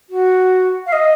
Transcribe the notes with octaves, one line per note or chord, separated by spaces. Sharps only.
F#4
F5
D#5